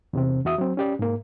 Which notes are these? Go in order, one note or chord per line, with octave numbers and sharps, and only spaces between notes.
E2 C3 C4
E2 F#4 E5 D#6
F#3 C4
C#4 G4 D5
G#2 A#3